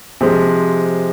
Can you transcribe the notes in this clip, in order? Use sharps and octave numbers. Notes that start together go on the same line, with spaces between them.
C3 F3 G#3